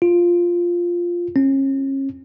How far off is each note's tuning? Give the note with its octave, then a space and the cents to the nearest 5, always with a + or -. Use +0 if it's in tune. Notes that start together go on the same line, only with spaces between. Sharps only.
F4 +0
C#4 -35